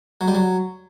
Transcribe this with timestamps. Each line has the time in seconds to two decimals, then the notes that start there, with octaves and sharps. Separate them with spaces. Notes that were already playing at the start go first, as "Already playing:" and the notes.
0.21 F#3
0.28 G3
0.35 F#3